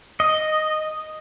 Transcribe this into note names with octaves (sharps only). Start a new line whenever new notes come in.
D#5